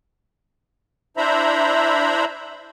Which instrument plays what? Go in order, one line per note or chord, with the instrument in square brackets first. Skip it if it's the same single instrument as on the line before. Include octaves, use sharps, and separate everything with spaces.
[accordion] D4 E4 C5 E5 A#5 B5